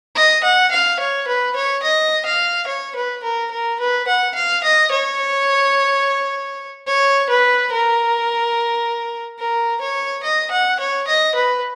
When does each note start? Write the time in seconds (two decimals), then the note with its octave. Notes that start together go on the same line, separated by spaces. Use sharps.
0.16 D#5
0.43 F#5
0.71 F5
1.00 C#5
1.27 B4
1.56 C#5
1.83 D#5
2.25 F5
2.67 C#5
2.96 B4
3.23 A#4
3.51 A#4
3.80 B4
4.07 F#5
4.35 F5
4.64 D#5
4.91 C#5
6.87 C#5
7.29 B4
7.72 A#4
9.39 A#4
9.81 C#5
10.23 D#5
10.51 F#5
10.80 C#5
11.08 D#5
11.35 B4